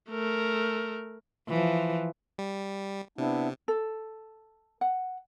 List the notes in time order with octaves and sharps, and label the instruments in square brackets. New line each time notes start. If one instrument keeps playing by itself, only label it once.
[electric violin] A3 A#4
[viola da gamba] E3 F3
[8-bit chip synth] G3
[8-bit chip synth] C3 [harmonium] B3 D4 E4
[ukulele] A4
F#5